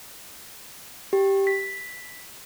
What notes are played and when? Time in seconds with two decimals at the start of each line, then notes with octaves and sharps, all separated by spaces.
1.13 G4
1.47 B6